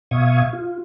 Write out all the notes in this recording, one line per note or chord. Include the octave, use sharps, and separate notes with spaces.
B2 E5 F5 C#6 D#6 G#6
F4